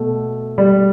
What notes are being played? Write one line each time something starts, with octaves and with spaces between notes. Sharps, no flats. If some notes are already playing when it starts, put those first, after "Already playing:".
Already playing: B2 A3
G3